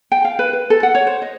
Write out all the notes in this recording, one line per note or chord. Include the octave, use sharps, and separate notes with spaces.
G5
F5
B4
B4
A4
F#5
C#5
C5
D#5